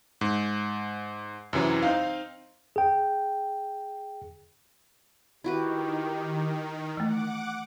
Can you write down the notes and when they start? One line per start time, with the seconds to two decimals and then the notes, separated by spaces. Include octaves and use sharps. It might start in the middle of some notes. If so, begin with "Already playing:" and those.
0.21 G#2
1.53 F#2 C3 E3 F#3
1.82 C4 D#4 F5
2.76 G#4 G5
5.44 D#3 E4 F#4 G4 B4
6.97 E3 A3 F#5 D6